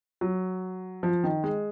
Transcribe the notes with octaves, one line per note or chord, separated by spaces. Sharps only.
F#3
F3
D#3
G#3